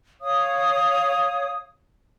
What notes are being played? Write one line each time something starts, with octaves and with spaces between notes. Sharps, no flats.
C#5 F5 D#6